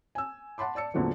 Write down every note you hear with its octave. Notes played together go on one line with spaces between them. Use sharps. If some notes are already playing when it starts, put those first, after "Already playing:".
G#5 E6
F#5 A5 B5 C6 D6
D5 A5 E6 C#7
E2 A#2 D3 F3 F#3 A3